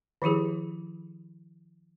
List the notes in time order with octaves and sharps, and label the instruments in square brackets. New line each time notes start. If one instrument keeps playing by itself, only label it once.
[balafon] D#3 F3 E4 G4 G#4